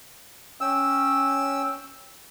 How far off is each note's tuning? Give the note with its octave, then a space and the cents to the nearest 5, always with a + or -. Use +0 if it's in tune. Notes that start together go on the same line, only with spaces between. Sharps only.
C#4 +0 G5 +10 E6 -5